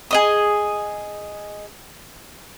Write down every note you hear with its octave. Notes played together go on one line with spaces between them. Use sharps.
G#4 D#5 D#6